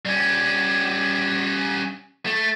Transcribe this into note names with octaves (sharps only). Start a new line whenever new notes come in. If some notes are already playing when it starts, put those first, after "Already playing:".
G3 C#4
A3